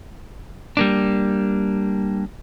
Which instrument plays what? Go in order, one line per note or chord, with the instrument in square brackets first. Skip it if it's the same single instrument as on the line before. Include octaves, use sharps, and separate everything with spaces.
[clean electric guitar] G3 A#3 D4